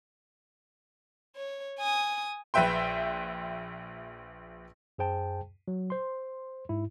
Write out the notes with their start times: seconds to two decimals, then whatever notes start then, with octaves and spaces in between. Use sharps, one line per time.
1.36 C#5
1.79 G#5 D#6
2.54 A#1 B4 E5 G5 C6
4.98 F#2 G#4 C5 G5 A5
5.68 F#3
5.90 C5 C6
6.69 G#2 E4